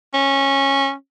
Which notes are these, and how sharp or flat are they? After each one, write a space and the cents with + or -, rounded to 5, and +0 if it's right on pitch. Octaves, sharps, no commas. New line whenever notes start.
C#4 -15